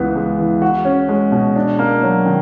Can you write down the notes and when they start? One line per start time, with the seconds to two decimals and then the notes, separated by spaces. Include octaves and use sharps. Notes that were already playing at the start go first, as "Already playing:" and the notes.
Already playing: C#2 E3 B3
0.16 G#3
0.38 E3
0.62 F#4
0.85 C#4
1.09 G#3
1.32 B2
1.56 D4
1.79 A#3
2.03 F#3
2.26 D#3